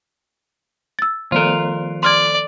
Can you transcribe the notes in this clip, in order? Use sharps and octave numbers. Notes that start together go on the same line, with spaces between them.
E6 A6
D#3 F3 F4 A4 A#4
D5 C6 F6 G#6